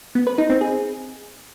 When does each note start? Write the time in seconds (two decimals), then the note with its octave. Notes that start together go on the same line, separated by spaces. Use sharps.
0.15 B3
0.27 B4
0.38 D#4
0.50 C4
0.61 G#4